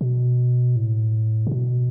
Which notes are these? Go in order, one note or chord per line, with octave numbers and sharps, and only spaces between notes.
B2
A2
C3
B2